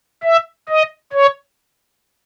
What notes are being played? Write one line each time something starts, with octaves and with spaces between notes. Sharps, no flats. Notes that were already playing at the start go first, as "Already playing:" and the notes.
E5
D#5
C#5